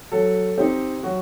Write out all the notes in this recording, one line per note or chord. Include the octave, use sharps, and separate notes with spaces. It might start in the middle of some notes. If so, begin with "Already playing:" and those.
F#3 A4
C4 D#4 G4
F#3 F#4